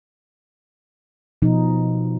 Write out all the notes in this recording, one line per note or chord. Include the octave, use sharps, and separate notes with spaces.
B2 F3 D#4